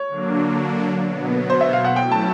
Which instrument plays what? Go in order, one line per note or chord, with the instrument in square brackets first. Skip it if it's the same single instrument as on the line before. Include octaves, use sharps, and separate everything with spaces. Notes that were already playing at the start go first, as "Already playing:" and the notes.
Already playing: [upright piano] C#5
[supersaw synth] D3 F#3 A#3 D4
B2 F#3 B3
[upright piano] C5
E5
F5
F#5
[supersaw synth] F#3 A3 C#4 E4 [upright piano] G5
[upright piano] A5